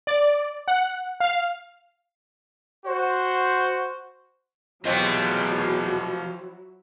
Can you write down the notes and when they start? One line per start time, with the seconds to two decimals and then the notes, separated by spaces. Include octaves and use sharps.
0.07 D5
0.68 F#5
1.20 F5
2.86 F#4 C5
4.85 E2 B2 F3 F#3 C4 E4 F#4 G4